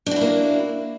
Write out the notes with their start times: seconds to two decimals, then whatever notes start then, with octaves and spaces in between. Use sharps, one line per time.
0.06 D4
0.11 F#4
0.16 E4
0.21 A#3